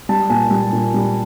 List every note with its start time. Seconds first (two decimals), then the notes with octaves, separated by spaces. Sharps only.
0.09 G3 A5
0.30 A#2 G#5
0.51 G3
0.73 A#2
0.94 G3